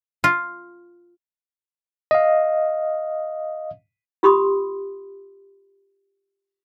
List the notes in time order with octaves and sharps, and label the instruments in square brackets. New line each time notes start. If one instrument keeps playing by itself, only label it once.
[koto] F4
[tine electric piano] D#5 F5
[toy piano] F4 G4 B5 C6 D#6